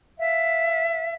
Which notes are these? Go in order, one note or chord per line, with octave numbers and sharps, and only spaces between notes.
E5 F5